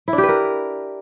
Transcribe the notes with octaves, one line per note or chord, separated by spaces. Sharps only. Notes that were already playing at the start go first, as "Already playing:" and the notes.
E4
D4
G4
B4
A#4